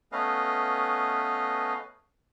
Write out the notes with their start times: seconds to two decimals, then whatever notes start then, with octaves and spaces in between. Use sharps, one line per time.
0.12 A3 B3 C#4 B4 D#5 F5